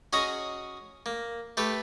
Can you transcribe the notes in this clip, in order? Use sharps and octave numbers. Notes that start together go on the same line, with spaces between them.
C#4 F#4 G#4 D#5 A#5
A#3
A3 G4 B4